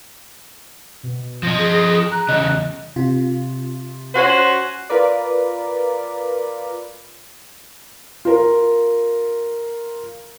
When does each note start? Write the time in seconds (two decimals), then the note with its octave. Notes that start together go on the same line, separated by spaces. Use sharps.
1.03 B2
1.43 F3 D#5 A#6
1.58 G#4
2.11 A#5 F#6
2.29 E2 C#3 D#5
2.96 C3 F4
4.15 C#4 F#4 C5
4.90 F4 A#4 B4 D5
8.25 F4 A#4